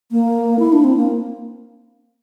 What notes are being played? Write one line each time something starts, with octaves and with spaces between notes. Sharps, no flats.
A#3
E4
D4
C4
A#3